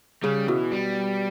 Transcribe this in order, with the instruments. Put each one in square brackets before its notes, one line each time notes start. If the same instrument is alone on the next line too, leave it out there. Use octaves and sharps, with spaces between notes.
[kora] C#3 [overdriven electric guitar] G3
[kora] B2 [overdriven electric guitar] E3
[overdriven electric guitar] G3